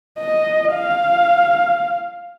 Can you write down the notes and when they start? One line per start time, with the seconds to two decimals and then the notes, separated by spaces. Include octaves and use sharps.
0.18 D#5
0.74 F5